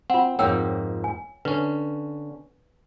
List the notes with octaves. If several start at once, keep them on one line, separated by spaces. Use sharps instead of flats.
C4 F4 F#5
F2 G#2 A#3 C#5 G5 E6
G#5
D3 C#4 B4